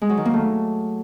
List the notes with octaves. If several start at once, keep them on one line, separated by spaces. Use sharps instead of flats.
G#3
F#3
D#3
A#3
A3